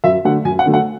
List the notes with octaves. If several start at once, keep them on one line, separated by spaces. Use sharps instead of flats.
F#2 E5
D3 F#3 A3 F#5
F#2 G#5
F#5
D3 F#3 A3
F#5